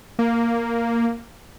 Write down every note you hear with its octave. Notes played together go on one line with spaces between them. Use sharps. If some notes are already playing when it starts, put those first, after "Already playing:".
A#3